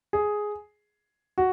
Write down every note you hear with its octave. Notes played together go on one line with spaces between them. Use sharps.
G#4
F#4